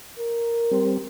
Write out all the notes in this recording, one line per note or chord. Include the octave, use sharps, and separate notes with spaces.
A#4
G3 C4